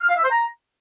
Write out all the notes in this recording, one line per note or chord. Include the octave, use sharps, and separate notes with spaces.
F6
F5
E5
C5
A#5